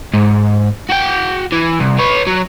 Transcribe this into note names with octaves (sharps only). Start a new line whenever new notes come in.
G#2
F#4 G5
E3
C2
B4 C#5
F#3